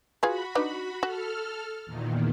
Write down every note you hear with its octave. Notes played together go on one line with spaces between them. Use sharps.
F4 F#4 G#4 B4 B5
D4 D#4 B4
F#4 A4 F6
E2 A#2 D#3